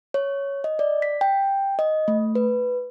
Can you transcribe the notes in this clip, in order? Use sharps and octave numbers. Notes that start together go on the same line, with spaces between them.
C#5
D#5
D5
B6
G5
D#5
A3
B4